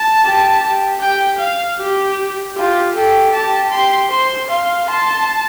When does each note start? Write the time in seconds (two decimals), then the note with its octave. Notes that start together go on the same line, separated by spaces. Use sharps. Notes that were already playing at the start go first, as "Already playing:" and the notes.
Already playing: A5
0.23 G4
0.62 G4
1.00 G4 G5
1.39 F5
1.78 G4
2.55 F4 G4
2.95 G4 A4
3.33 G4 A5
3.71 G4 C6
4.10 C5 C6
4.50 F5 C6
4.88 A5 C6